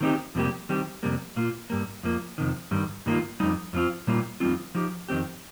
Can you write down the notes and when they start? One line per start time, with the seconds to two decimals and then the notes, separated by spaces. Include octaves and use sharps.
0.01 D#3 C4 D#4 G4
0.35 F2 C3 G3 A#3 G4
0.69 D#3 G3 C4 G4
1.03 F2 C3 G3 A#3
1.36 A#2 A#3 F4
1.70 G2 G3 A#3
2.03 F2 F3 A#3
2.38 F2 C3 D#3
2.71 G2 D#3 G3
3.06 G2 D#3 A#3 F4
3.40 F2 C3 G3 D#4
3.73 F2 F3 C4 F4
4.07 A#2 G3 A#3 F4
4.40 F2 D#3 G3 C4 F4
4.75 F3 D#4 G4
5.09 F2 D#3 C4 G4